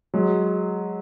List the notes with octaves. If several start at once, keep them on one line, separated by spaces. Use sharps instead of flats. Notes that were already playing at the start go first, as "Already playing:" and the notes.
F#3 G#3